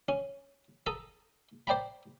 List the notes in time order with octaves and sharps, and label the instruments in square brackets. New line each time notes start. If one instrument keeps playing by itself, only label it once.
[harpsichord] C#4
A4 A#5 D#6
C5 D5 G5 A#5 B5